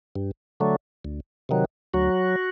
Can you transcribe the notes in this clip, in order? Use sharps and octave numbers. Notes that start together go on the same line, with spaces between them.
G2
D3 F#3 A3
D2
C3 D#3 F#3
D2 F#3 F#4